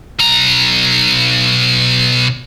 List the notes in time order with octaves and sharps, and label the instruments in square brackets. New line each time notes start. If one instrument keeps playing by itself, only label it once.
[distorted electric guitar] B1 A#5